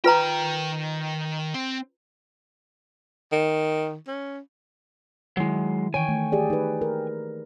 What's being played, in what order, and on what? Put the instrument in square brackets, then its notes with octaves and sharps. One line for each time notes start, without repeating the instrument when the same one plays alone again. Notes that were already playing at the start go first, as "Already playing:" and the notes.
[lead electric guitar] D#3 G5 [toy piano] F4 B4 A#5
[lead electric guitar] C4
[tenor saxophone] D#3
C#4
[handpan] D#3 E4 [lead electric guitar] F#3 G#3
[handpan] D#3 E3 C#5 [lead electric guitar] G5 G#5
[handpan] A3
G4 G#4 D5
D#4 B4
A#4